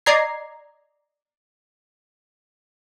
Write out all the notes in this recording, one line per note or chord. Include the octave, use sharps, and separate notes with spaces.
D5 D#5 A#5 G#6 C7